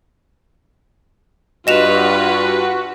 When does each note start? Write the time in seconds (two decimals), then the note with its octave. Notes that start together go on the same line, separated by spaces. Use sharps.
1.67 G2 F4 F#4 B4 D#5 E7 F7